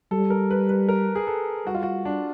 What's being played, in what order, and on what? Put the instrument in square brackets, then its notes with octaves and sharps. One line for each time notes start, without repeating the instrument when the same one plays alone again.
[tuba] G3 [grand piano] A4
[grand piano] A#4
B4
B4
A#4
G#4
A4
[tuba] G3 [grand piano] F#4
[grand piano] F4
F#4
D4